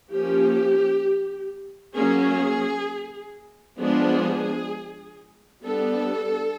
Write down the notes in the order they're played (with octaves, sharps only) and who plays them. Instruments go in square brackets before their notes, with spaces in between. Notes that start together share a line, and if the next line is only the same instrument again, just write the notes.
[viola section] F3 A#3 C#4 G4
F#3 A#3 C#4 G#4
F3 G#3 B3 D4 G#4
G3 B3 D4 A4